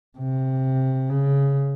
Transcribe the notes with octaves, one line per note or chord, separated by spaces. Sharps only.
C3
C#3